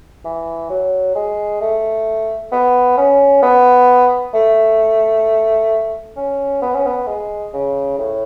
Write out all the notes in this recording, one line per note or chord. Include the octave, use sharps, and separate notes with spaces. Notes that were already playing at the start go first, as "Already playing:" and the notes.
E3
F#3
G#3
A3
B3
C#4
B3
A3
C#4
B3
C#4
B3
G#3
C#3
A2